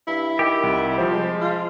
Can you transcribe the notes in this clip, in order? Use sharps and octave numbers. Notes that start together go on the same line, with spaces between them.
G2 E4
D#3 G4
C2
F3 C4 C5
G#3
F4